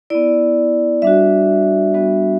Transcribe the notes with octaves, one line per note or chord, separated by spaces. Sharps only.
B3 E4 D5
G3 D4 F#4 E5
G3 B3 D4 F#4